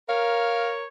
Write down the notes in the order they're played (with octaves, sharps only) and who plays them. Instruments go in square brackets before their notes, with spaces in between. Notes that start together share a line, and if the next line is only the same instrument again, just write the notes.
[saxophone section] A#4 [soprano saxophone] C#5 [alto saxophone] F5